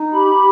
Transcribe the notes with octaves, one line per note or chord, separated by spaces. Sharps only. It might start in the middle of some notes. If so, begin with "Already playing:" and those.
Already playing: D#4
G4 B5